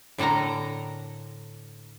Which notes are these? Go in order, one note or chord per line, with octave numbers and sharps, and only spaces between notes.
A2 D3 A4 A#4 A#5